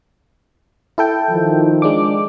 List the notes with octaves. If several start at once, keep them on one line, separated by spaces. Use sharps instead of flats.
E4 A4 G5
D#3 F3
G#3 D4 D6